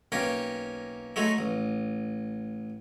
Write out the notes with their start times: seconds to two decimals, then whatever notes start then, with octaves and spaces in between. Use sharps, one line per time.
0.12 B1 A#3 C#4 G5
1.16 F#3 G#3 A3 D#4
1.38 A1